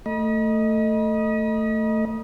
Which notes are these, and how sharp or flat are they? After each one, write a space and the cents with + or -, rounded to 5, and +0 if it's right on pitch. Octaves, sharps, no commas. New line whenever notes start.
A3 +15 D#5 +0 B5 -45